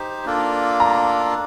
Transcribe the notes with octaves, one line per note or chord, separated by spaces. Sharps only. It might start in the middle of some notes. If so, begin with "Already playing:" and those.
Already playing: D#4 G4 C5
A#3 D4 F4 A4
A#5